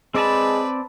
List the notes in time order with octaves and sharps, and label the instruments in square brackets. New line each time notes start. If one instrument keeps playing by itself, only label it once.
[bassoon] G#3 [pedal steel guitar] C4 D5 A5 [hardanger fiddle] B4